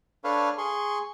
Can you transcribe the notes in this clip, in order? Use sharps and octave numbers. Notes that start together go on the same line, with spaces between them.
D4 A4 B4 C#5 F5
G#4 C6 C#6